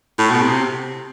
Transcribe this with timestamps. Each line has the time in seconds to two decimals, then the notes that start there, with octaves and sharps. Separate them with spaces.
0.19 A2
0.31 B2
0.43 C3